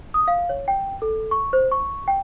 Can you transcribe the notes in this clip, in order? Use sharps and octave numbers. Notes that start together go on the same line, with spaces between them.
D#6
F5
C#5
G5
A4
C#6
C5
C#6
G5